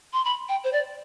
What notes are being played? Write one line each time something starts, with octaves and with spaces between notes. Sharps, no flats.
C6
B5
G5
C5
D5